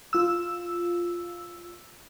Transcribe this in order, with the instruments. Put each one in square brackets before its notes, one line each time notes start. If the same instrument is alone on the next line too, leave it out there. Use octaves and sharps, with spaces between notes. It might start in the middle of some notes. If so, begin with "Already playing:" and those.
[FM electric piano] F4 E6